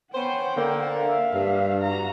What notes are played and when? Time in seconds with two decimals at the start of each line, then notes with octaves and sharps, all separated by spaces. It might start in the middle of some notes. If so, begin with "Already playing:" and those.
0.14 B3 C#4 C5 F#5 G5
0.56 D3 A#3
0.98 E5 F5
1.33 G2
1.82 F#4 A#5